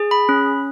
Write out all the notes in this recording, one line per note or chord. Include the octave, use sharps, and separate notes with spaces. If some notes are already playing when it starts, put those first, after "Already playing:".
Already playing: G#4
B5
C#4